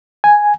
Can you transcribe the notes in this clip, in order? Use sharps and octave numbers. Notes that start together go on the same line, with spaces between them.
G#5